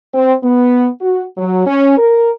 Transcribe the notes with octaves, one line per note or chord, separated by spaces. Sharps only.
C4
B3
F#4
F#3
C#4
A#4